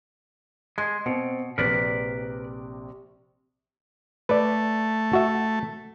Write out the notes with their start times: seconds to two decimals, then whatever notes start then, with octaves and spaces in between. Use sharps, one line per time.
0.78 G#3 C6
1.06 B2 C4
1.58 A#1 C3 A#4 B4 D5
4.29 A3 B4 D5
5.13 F#4 E5